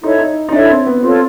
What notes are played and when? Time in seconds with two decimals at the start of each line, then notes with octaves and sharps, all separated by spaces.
0.03 D#4 E4 A4 C#5 E5
0.18 D#4
0.49 D#4
0.52 D4 E4 A4 C#5 E5
0.70 C4
0.86 B3
1.03 C4 F4 A4 C#5